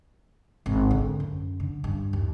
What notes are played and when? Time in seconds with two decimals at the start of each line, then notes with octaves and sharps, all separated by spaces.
0.66 G#1
0.91 D3
1.20 F#2
1.60 D3
1.84 G2
2.13 D#2